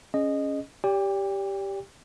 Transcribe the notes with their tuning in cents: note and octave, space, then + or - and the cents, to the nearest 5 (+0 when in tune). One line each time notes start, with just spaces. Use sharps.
C#4 +0 G#4 +15 D#5 -15
G4 +0 D5 -35 G5 +30